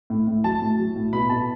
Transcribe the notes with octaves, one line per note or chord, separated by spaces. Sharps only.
A2
A2
F#3 A5
A2
F#3
A2
B2 B5
B2 A5